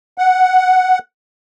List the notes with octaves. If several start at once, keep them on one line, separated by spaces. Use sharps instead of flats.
F#5